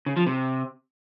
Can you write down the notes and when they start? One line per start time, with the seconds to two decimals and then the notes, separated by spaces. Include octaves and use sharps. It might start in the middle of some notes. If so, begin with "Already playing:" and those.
0.06 C#3
0.16 F3
0.27 C3